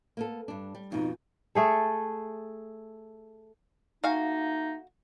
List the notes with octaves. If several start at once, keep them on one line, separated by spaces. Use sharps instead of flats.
A#3 B3 A4
G2 D4
G3
F2 B2 D#4
A3 G#4 A4
A3 A#3 D#4 F#4 F5 G#5